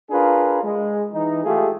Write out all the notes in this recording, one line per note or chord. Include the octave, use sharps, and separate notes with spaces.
D4 F4 G#4 A#4 B4
G#3
E3 D#4
G#3 A3 F4 G4 G#4